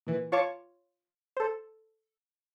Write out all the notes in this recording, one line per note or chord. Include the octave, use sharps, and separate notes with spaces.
A#2 E3
F4 C#5 F5 A5 C#6 D6
A4 C5